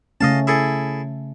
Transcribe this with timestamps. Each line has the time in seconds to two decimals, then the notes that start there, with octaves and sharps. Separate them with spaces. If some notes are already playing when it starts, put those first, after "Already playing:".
0.21 C#3 A3 C#4 D#5 F5 A5
0.47 E4 G#4 A4